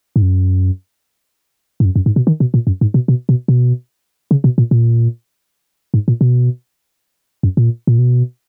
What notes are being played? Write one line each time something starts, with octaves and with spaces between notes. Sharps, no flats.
G#2
F#2
G#2
F#2
F#2
G#2
B2
D#3
B2
A#2
F#2
G#2
B2
B2
B2
B2
C#3
B2
A#2
A#2
G#2
A#2
B2
F#2
A#2
A#2
B2